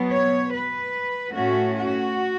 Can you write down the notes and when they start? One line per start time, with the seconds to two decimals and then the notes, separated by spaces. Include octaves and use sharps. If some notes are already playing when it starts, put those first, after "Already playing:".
Already playing: B2 F#3 B3
0.11 C#5
0.53 B4
1.35 A2 A3 C#4 F#4
1.76 F#4